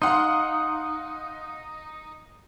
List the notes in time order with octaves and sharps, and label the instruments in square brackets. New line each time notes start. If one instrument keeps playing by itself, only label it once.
[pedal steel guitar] D#4 [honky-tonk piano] F5 F#5 C6